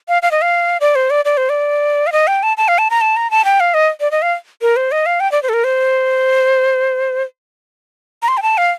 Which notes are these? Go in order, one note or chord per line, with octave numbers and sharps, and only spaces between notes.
F5
F5
D#5
F5
D5
C5
D5
D5
C5
D5
F5
D#5
G5
A5
A5
F5
A5
A#5
A5
A#5
A5
G5
F5
D#5
D5
D#5
F5
A#4
C5
D#5
F5
G5
D5
C5
A4
A#4
C5
A#5
C6
G5
A5
F5